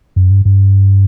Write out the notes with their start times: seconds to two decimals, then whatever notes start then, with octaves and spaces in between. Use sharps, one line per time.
0.16 F#2
0.31 G2
0.45 G2